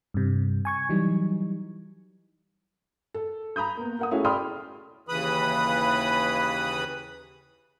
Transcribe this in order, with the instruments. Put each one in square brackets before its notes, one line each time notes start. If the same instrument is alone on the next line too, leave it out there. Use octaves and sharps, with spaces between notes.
[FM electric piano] G2 C3
G#5 C#6 G#6
E3 F#3 G3 D#4
[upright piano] A4
A#5 B5 D#6 G6
A#3 B3
A#4 F#5 D#6
A3 C#4 E4 F#4 G#4
D5 G5 B5 C6 D#6 F6
[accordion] D#2 C#3 E3 B4 B5 D#6